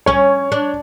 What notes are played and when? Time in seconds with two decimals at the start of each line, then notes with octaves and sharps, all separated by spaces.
0.06 C#4 C#5
0.52 D4